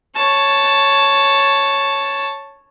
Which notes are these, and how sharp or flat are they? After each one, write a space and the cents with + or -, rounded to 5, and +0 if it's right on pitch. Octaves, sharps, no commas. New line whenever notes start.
C#5 +0 A5 +0